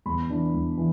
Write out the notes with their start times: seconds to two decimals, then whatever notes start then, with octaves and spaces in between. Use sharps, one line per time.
0.06 E2 B5
0.29 E3 D4
0.54 E2
0.77 E3